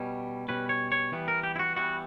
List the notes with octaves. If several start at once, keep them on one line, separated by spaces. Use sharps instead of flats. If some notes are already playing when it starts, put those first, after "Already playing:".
Already playing: B2 G3 C#4
B2 G3 C#4 B4
C#5
C#5
E3 G3 B3
A#4
G4
E4
F#4
E3 G3 B3 F#4